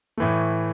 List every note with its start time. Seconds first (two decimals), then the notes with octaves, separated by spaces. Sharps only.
0.17 A2 E3 A3